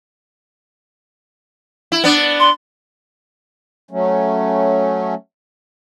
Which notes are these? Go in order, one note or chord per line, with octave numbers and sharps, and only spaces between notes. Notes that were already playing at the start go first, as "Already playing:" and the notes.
E4
B3 D4
C6
F#3 A3 C#4